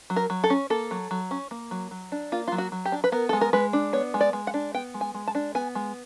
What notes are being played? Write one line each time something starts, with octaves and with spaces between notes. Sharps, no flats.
F#3
A#4
F#3
A4
C#4
A#3 A4
F#3
F#3
C#4
A#3
F#3
F#3
D4
A#3 F4
F#3 F4
F#4
F#3
G4
D4
B4
B3 A#4
G#3 A4
A#4
G#3 B4
D4
B3 C#5
G#3
D5
G#3
F#5
D4
B3 G5
G#3
G#5
G#3
A5
D4
B3 G#5
G#3